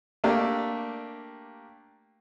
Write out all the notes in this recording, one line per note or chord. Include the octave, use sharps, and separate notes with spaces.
A3 A#3 D4 G4